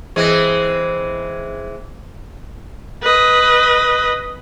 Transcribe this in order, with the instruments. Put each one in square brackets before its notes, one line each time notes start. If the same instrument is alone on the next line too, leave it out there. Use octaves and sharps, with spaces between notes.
[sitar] E3 G#3 C4
[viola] B4 D#5